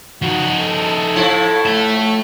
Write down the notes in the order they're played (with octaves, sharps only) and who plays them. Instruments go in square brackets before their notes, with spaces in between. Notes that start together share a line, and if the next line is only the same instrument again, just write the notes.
[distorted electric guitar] F3 D#4 [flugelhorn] F#4
[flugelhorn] A4
[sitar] A2 F3 E4
[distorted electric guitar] A3 A5